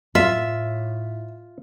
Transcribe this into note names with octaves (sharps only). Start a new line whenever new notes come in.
A2 F4 E5